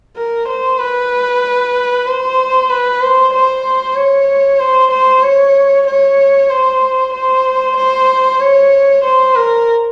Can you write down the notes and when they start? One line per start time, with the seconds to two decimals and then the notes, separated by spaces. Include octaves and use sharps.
0.16 A#4
0.48 C5
0.79 B4
2.06 C5
2.69 B4
3.01 C5
3.33 C5
3.96 C#5
4.60 C5
4.91 C5
5.23 C#5
5.87 C#5
6.50 C5
7.13 C5
7.77 C5
8.40 C#5
9.04 C5
9.36 A#4